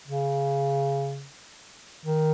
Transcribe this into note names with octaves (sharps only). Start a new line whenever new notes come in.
C#3
D#3